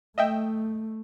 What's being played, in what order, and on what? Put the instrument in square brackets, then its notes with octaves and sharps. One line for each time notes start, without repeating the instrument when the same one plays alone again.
[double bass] A3 [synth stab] D#5 E5 G5